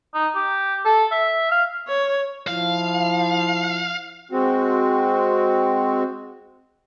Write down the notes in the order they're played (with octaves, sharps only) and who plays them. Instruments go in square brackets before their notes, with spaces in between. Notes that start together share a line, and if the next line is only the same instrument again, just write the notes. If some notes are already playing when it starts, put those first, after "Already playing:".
[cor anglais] D#4
G4
A4
E5
F5
[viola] C#5
[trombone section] F3 E4 [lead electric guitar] F5
[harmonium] G#3 C4 F#4